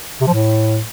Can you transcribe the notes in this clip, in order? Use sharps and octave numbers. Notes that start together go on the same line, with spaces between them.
C3
F3
A2